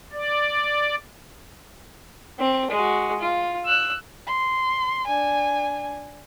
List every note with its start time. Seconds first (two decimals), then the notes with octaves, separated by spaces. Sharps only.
0.13 D5
2.39 C4
2.70 G#3 F#4
3.19 F4
3.65 E6 F#6
4.27 C6
5.07 D4 G#5